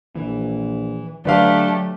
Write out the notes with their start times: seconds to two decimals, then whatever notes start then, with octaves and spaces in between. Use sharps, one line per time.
0.16 A#1 E3
1.25 D3 F#3 A3 D4 G4 B4 F5